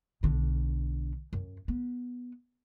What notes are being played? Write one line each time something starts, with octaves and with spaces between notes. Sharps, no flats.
B1 D3
F#2
B3